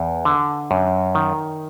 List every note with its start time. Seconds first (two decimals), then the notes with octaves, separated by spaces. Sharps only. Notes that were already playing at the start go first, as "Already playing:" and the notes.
Already playing: E2
0.25 D3
0.71 F#2
1.15 D#3